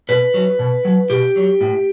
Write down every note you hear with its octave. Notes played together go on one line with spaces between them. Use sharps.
B2 B4
F#3
B2
F#3
B2 G4
F#3
A2